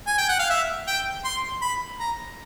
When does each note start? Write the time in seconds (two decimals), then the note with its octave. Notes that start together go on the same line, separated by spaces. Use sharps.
0.07 G#5
0.18 G5
0.29 F#5
0.39 F5
0.50 E5
0.87 G5
1.25 C6
1.62 B5
2.00 A#5